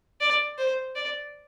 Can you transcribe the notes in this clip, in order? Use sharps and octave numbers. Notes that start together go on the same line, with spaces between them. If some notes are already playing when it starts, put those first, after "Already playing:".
D5
C5
D5